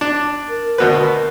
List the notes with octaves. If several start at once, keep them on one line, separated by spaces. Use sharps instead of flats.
D4
A#4
D2 B2 B4